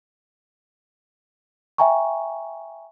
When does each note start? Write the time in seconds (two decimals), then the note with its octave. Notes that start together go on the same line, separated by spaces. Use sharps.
1.78 E5 G5 G#5 A#5 C#6